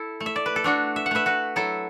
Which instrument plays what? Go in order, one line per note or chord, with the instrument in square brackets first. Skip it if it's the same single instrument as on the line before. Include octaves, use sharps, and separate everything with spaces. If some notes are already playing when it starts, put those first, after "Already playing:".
Already playing: [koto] E4 A4
A3
E5
D5
B4
A4
A3 D4 F#4
E5
F#5
A3 B4 E5
F#4 B4
F#3 E4 A4